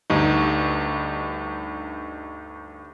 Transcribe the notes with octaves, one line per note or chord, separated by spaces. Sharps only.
D2 G2 D#4